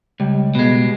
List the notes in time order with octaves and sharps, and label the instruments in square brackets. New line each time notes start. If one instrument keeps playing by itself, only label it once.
[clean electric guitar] C#2 [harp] G3
[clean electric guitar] B2 G#3 [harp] B3